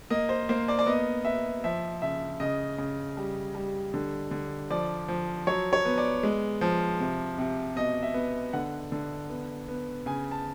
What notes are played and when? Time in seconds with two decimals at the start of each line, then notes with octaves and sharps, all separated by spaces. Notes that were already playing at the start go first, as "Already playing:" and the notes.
0.10 A#3 D#5
0.29 C5
0.49 A#3 C5
0.68 D5
0.79 D5
0.86 B3 D#5
1.25 B3 E5
1.64 F3 E5
2.02 C#3 E5
2.40 C#3 D#5
2.78 C#3
3.17 G3
3.55 G3
3.94 D3
4.31 D3
4.70 F3 D5
5.08 F3
5.47 F#3 C#5
5.73 C#5
5.85 B3
5.98 D5
6.23 G#3
6.61 F3
7.01 C3
7.38 C3
7.76 B2 D#5
8.03 E5
8.14 B3
8.53 D3 F#5
8.92 D3
9.29 B3
9.68 B3
10.06 C#3 G#5
10.31 A5